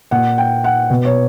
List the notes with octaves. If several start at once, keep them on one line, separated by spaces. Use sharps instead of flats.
A#2 F#5
G5
F#5
B2
C#5